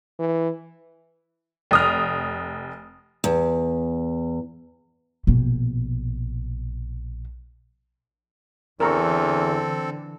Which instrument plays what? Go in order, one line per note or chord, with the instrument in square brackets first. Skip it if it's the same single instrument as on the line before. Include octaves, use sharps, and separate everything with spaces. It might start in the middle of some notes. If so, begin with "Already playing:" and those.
[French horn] E3
[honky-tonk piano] F1 D#6 F6
[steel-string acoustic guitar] E2
[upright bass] A#1 B2
[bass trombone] E2 [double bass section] D3 E3 [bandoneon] C4 A4 [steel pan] A#4 A#5 C#6